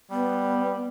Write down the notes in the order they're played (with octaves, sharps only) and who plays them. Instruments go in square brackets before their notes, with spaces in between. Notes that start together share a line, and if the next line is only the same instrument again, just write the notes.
[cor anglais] G3 [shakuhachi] B3